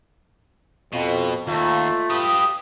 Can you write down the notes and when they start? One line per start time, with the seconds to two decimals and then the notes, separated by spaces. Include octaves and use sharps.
0.93 F2 B2
1.47 D#2 A3 F4
2.10 G4 B4 D#6